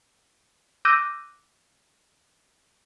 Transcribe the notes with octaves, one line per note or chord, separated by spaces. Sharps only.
D6 E6 F#6 G6 A#6 D#7